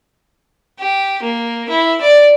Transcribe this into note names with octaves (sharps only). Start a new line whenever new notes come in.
G4
A#3
E4
D5